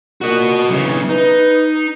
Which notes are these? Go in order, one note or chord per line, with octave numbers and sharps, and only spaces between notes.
A#2 F#4 D#5
B1 C#3 E3
D#4 B4